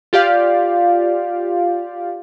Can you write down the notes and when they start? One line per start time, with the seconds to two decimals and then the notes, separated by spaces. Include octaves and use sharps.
0.13 F4 G4 D5 F5